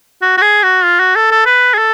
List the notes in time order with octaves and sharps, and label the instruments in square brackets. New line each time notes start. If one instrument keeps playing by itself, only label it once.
[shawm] F#4
F#4
G#4
F#4
F4
F#4
A4
A4
B4
G#4
A4